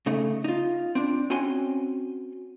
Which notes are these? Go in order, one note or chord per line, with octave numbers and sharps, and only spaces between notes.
C#3 A3 D#4
D#4 F4
C4 D4
C4 C#4 F#4 C#5 G#5 C6